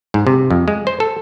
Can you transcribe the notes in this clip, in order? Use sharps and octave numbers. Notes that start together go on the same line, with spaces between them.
G#2
C3
F2
G#3
C5
A4